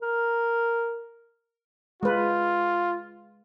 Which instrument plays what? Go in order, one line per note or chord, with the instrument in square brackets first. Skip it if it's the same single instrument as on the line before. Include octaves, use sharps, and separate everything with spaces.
[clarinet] A#4
[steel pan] G#3 B4 [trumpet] F4